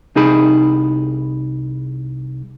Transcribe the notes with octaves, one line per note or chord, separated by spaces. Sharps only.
C2 D#4 G#4 B5